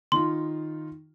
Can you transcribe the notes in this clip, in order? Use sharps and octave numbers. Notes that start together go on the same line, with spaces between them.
D#3 D#4 F4 C6